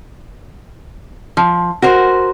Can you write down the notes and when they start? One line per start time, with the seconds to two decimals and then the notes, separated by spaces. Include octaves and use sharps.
1.37 F3
1.82 F#4 A#4 C5